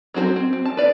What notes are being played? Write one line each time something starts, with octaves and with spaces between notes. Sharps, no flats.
F#3 C4 F#4 G#4 C5
C4
C4
A5
B4 D5 F5